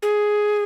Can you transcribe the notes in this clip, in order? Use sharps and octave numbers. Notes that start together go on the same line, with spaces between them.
G#4